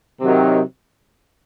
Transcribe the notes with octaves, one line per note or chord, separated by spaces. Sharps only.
C3 D#3 F#3